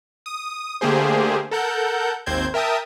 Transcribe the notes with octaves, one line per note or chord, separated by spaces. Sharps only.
D#6
D3 A3 A#3 G4 G#4 C5
A4 A#4 F#5 G6
G#1 D#2 C4 C5 G6 G#6
A#4 E5 G5 A5 D#6